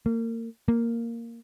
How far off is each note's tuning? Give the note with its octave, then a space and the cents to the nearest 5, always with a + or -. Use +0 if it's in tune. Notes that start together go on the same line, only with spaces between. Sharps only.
A#3 -30
A#3 -5